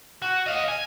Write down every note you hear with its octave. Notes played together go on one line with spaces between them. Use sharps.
F#4
D#5 F5
G#5